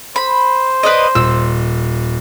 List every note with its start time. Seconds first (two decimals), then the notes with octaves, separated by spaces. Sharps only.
0.16 C5 B5
0.83 B4 D5 D#5
1.15 D#1 E6